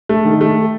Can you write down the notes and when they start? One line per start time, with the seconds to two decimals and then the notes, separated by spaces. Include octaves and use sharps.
0.09 A3
0.25 D#3
0.41 A3